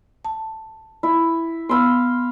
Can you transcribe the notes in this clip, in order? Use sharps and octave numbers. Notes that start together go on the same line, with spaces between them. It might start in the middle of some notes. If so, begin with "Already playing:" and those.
A5
E4
B3 F5 B5 C6 E6